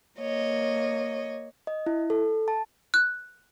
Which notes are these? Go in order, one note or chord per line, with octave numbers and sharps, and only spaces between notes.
A#3 C#5 D#5
D#5
E4
A4
A5
F#6